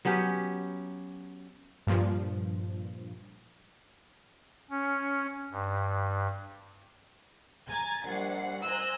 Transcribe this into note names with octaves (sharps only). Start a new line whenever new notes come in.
F#3 B3 C#4 G4
G2 A#2 F3
C#4
G2
G#5 A#5 G#6 A6
A#1 G3 F#5 C7
C5 D#5 G#5 A#5 E6 F#6